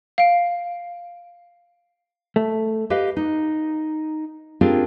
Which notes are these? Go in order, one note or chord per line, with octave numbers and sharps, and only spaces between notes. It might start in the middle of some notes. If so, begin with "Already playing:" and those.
F5 D7
A3
G4 B4 D#5 F5
D#4
C4 D4 F4 G4 G#4 A#4